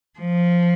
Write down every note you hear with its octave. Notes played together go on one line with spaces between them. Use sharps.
F3